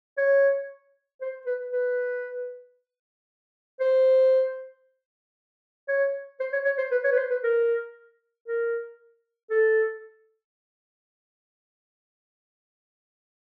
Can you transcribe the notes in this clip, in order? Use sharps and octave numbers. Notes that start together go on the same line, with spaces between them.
C#5
C5
B4
B4
C5
C#5
C5
C#5
C#5
C5
B4
C#5
B4
C5
B4
A#4
A#4
A4